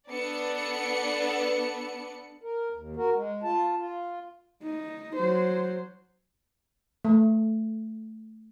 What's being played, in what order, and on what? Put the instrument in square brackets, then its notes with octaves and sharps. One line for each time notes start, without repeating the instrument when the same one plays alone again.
[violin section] B3 D4 A4 B4 D5 C#7
[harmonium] A#4
D#2
F#4 A#4
G#3
F4 A5
F4
[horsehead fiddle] D#4
F#3 C5
[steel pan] A3